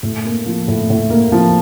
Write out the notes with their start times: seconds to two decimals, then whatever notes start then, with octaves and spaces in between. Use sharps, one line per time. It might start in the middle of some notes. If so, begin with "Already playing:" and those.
0.03 A2
0.25 A#3
0.46 F3
0.68 A2
0.90 A2
1.10 A#3
1.32 F3